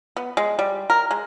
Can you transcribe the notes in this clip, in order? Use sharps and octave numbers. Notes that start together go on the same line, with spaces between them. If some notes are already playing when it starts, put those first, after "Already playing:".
B3
G#3
G3
A#4
G#3